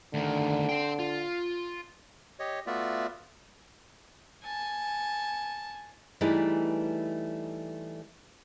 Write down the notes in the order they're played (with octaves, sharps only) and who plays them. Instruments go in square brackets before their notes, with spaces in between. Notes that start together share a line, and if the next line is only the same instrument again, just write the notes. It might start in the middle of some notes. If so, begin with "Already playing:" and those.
[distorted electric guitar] D2 D#3 [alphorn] D3
[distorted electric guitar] C5 G5
F4
[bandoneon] G4 C#5 D#5
A3 B3 F4 F#4 D5 E5
[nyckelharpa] G#5 A5
[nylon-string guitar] E3 G3 A3 D#4 G#4 B4